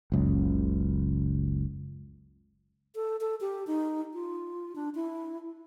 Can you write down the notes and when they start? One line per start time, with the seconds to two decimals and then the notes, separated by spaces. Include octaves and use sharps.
0.12 F#1 C#2
2.95 A4
3.21 A4
3.41 G4
3.67 D#4
4.14 F4
4.76 D4
4.95 E4